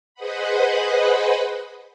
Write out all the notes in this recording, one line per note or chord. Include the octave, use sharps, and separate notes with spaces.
G#4 B4 C5 D#5 F#5 B5